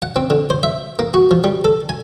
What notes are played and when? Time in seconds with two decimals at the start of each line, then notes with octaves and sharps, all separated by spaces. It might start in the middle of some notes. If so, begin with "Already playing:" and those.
0.02 F#5
0.16 C4
0.30 D3
0.50 C5
0.63 E5
0.99 A#3
1.14 F#4
1.31 F3
1.44 G3
1.65 A4
1.89 G#5